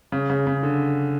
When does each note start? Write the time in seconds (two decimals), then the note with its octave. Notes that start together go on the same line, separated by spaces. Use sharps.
0.12 C#3
0.30 C#3
0.47 C#3
0.63 D3